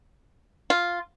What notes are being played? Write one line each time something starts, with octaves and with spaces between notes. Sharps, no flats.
F4